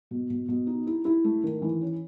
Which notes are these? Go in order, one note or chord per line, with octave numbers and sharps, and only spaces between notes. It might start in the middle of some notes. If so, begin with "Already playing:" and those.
B2
B2
B2
D#4
E4
E4
A3
D#3
E3
C#4